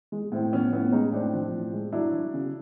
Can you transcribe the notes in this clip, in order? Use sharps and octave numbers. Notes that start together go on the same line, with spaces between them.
G#3
A2 C4
F3 B3 C#4
A2 B3 C#4
G#3 C#4 D#4
A2 C4 D4
F3
A2
G#3
F#3 D4 E4
F#3
C#3